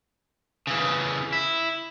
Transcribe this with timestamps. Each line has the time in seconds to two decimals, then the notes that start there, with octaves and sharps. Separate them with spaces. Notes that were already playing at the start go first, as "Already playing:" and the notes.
0.67 C#3 E3
1.32 E4